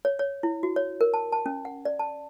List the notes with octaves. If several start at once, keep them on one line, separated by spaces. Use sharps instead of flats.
C#5
C#5
E4
F#4
C#5
A#4
A5
A5
C#4
F#5
D5
A5